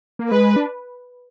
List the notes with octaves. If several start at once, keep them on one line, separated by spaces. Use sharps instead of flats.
A#3
G#3 B4
D4